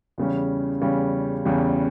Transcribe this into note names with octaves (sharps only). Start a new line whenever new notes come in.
E2 C#3 G3 C#4
E2 C#3 G3 C#4
E2 C#3 G3 C#4